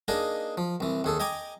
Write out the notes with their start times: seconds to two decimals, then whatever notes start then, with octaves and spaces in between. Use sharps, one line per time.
0.08 A#3 D4 D#4 G#4 D#5
0.57 F3
0.80 C2 E3
1.04 D#2 G#4 A4
1.20 D#5 G5 G#5 A#5 D6